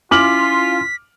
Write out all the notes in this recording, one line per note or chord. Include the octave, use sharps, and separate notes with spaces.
C#4 E4 F4 G#5 D6 F6 B6 F#7